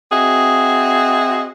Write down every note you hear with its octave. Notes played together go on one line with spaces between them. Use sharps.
C4 F#4 G#4 D#5 E5